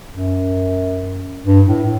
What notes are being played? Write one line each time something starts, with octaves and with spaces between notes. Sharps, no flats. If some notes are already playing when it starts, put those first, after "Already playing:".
F#2
G2
A2